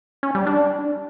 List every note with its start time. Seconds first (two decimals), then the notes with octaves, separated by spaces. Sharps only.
0.23 C#4
0.35 G3
0.47 D4